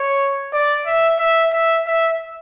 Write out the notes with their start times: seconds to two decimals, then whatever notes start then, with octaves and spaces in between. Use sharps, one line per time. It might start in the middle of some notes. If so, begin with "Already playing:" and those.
Already playing: C#5
0.53 D5
0.86 E5
1.20 E5
1.53 E5
1.87 E5